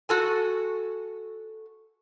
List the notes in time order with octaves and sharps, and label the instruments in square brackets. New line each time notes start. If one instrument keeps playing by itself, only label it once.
[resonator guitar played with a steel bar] F#4 A4 G#5